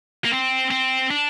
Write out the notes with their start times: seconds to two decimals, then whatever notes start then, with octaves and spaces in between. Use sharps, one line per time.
0.25 A#3
0.31 C4
0.71 C4
1.11 D4